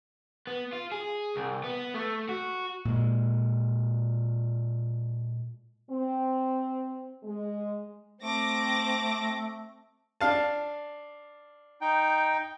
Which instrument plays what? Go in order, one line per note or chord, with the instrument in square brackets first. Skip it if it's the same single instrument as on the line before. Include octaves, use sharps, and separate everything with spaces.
[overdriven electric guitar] B3
F4
G#4
C2
B3
A3
F#4
[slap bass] A#2 G#3
[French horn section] C4
G#3
[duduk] A3 [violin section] C4 D6 A#6
[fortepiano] D4 F5 A5
[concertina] D#4 G5